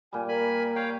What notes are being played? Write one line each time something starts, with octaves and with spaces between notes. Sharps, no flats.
A#2 G3 G#5
A#4 G#5 B5
C#5 F5 G5